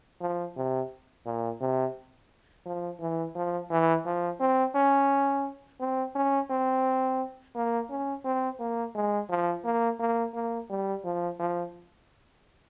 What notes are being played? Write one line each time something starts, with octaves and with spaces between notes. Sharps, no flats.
F3
C3
A#2
C3
F3
E3
F3
E3
F3
C4
C#4
C4
C#4
C4
A#3
C#4
C4
A#3
G#3
F3
A#3
A#3
A#3
G3
F3
F3